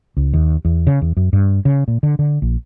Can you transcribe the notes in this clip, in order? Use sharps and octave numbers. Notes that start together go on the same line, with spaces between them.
C#2
D#2
E2
C#3
E2
F#2
G2
C#3
A#2
D3
D3
A#1